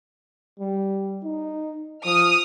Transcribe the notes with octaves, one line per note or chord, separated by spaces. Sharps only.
G3
D#4
F3 D#6 F6